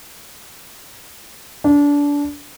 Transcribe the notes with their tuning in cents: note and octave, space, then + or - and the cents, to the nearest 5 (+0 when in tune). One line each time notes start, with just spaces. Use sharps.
D4 -25